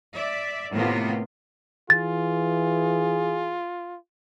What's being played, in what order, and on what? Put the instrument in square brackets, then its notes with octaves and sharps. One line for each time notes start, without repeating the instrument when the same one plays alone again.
[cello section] D5 E5
A2 C3 D#3 A#3 B3 F4
[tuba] E3 [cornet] F4 [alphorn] G#4 [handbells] A6